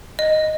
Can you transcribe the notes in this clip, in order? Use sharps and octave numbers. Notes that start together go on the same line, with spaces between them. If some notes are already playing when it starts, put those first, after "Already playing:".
D#5